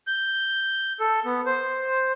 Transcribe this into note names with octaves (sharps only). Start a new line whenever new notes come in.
G6
A4
B3
C5